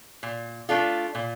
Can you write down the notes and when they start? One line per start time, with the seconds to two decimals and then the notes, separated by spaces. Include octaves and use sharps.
0.23 A#2
0.69 A3 D4 F4 A4
1.15 A#2